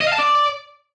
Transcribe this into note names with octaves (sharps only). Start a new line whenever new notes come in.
D#5
F5
A5
D5